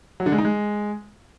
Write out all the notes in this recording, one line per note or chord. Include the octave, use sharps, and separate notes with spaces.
F#3
D3
G#3
D#4
G#3